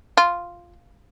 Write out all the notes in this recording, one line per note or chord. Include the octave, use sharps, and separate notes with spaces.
F4